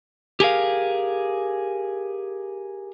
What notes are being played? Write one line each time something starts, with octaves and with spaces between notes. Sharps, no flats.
G4 G#4 A#4 F5